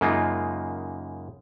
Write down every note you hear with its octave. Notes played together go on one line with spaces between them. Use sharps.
F#2 C#3 G#3 A#3 D#4 F4